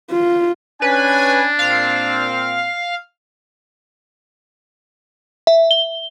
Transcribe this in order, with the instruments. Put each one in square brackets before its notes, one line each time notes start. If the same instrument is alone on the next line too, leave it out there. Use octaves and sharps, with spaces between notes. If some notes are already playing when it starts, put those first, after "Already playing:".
[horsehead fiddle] F4
[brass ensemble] C#4 G#5 [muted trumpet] D4 [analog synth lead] B4
[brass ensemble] A#2 C4 [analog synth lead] F5
[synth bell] E5
G7